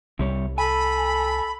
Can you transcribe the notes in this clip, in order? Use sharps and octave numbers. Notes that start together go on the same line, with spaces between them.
C2 C3 G3 C#5
A4 G#5 B5